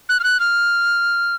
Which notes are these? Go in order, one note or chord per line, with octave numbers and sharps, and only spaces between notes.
F#6
F6
F#6
F6